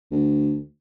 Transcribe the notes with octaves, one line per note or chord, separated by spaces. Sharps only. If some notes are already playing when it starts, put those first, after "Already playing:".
D2